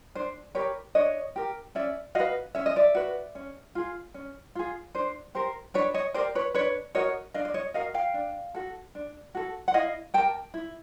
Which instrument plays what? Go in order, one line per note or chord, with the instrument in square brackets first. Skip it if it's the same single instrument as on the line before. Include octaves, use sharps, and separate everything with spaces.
[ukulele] D4 C5
G4 A#4 B4 C#5
D4 C#5 D#5
G4 A#4
C#4 D5 E5
F#4 B4 D#5 F5
C#4 E5
D#5
D5 E5
F#4 B4
C#4
F4 G#4
C#4
F4 G#4
D4 C5
G4 A#4 C5
D4 B4 C#5
C#5 D#5
G4 A#4 C5 D5
B4 C#5
D4 B4 C#5
F#4 A#4 C#5 D#5
D4 D#5 F5
D5
C#5 D#5
F#4 A#4 D#5 F5
F5 G5
D4
F#4 A4
D4
F#4 A4
F#5
E4 D#5 F5
G4 A#4 G5 A5
E4